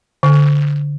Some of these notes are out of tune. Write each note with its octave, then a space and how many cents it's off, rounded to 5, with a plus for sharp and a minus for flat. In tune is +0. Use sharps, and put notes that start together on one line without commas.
D3 -15